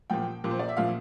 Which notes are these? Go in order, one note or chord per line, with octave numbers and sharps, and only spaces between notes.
A#2 F3 G5
A#2 F3
C5
D5
E5
A#2 F3 F5